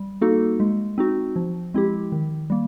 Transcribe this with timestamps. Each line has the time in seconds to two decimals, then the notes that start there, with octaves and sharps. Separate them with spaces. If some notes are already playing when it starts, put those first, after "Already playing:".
Already playing: G3
0.21 A#3 D#4 F#4 A4
0.60 G#3
0.98 C4 D#4 F#4
1.36 F3
1.74 G#3 C4 E4 G4
2.12 D#3
2.50 G3 A#3